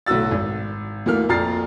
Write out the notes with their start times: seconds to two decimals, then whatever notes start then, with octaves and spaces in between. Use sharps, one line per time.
0.06 B1 A2 D3 F#4 E6 A6
0.31 G#1
1.06 D2 E3 A#3 F6
1.29 A#1 F2 A#5 F6 A6 C7